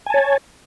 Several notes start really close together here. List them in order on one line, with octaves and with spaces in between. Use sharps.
G#5 A5 C#5